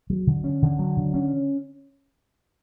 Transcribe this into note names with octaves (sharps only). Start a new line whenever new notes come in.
F#3
D3
C#4
D3
F#3
D3
C#4